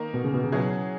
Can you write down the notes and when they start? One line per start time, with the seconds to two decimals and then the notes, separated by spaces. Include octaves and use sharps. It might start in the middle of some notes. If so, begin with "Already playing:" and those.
Already playing: D#3 A#3 D#4 A#4
0.14 B2
0.24 C#3
0.34 B2
0.44 C#3
0.52 B2 F#3 C#4 E4 G#4